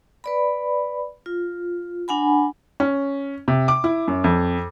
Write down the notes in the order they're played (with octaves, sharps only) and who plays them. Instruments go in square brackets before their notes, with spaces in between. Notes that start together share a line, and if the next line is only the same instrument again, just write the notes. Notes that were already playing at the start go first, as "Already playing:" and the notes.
[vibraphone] B4 D5 B5
F4
D4 F#5 G#5 B5
[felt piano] C#4
C3
D6
E4
F#2
F2